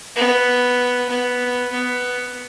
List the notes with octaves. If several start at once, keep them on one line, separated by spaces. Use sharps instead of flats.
B3
B3
B3